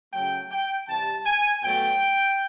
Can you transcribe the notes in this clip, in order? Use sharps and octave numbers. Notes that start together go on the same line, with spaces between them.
C#3 F#3 A3 G5
G5
C3 E3 G3 A5
G#5
B2 F#3 A3 G5